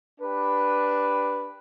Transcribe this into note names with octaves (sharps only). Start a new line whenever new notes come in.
D4 G4 B4